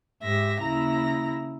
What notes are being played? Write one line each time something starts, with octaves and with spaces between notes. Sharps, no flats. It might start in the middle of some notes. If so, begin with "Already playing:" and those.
G#2 G4 E5 A#6
D#2 C#3 E4 A#5 A#6